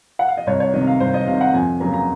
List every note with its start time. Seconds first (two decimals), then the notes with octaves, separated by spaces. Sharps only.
0.19 F#5
0.28 F5
0.37 D#5
0.47 C2 C#5
0.60 C#5
0.74 C3 D#3 D#5
0.87 F5
1.00 C2 C5
1.14 D#5
1.27 C3 D#3 F5
1.41 F#5
1.54 F2 G#5
1.80 C#3 F#3 A#3 A#5
1.94 A#5